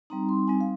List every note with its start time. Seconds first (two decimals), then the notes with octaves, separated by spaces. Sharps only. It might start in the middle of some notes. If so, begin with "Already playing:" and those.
0.10 G3 C4 D#4 A#5
0.29 C6
0.48 G3 C4 D#4 G#5
0.61 F5